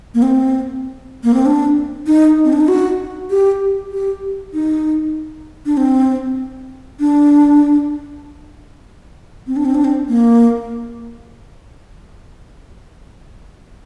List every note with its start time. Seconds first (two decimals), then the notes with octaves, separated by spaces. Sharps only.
0.14 A#3
0.22 C4
1.24 A#3
1.34 C4
1.46 D4
2.07 D#4
2.44 C4
2.53 D4
2.60 D#4
2.68 F#4
3.31 G4
3.92 G4
4.54 D#4
5.66 D4
5.77 C4
7.00 D4
9.47 C4
9.56 D4
9.65 C4
9.74 D4
9.84 C4
10.09 A#3